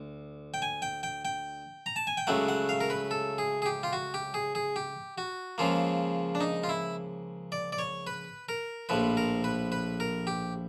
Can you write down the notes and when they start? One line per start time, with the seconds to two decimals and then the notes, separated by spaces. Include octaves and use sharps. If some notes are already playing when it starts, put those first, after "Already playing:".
Already playing: D2
0.54 G5
0.62 G#5
0.82 G5
1.03 G5
1.25 G5
1.86 A#5
1.96 A5
2.07 G#5
2.17 G5
2.27 C#2 C#3 F#3 A3 F#5
2.49 F#5
2.69 F5
2.81 A#4
2.90 B4
3.11 A4
3.38 G#4
3.62 G#4
3.66 G4
3.83 F4
3.93 F#4
4.14 G4
4.34 G#4
4.55 G#4
4.76 G4
5.18 F#4
5.58 C#2 C#3 F3 A#3 F4
6.35 D4
6.41 D#4
6.63 F4
6.69 E4
7.52 D5
7.72 D5
7.78 C#5
8.07 B4
8.49 A#4
8.89 A#1 A2 F3 B4
9.17 A#4
9.44 B4
9.72 B4
10.00 A#4
10.27 G4